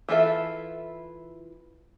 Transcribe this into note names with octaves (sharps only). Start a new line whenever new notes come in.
E3 E4 F4 A4 E5